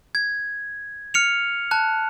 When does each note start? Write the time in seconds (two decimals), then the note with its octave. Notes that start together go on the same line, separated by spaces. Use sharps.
0.15 G#6
1.14 F6 C#7 F7
1.71 A5 F#6